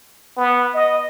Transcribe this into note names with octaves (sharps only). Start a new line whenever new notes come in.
B3
D#5